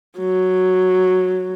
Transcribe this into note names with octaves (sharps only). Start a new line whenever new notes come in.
F#3